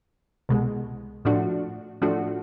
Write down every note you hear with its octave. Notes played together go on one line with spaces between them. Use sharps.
C2 B2 G#3
A2 F3 A3 D4 F#4
A2 F3 A3 D4 F#4